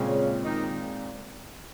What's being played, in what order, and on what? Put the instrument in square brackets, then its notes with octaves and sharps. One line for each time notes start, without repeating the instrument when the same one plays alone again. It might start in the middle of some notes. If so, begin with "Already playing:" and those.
Already playing: [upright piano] A#2 G#3 C4 [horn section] C#3 C#4
[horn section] D#3 D#4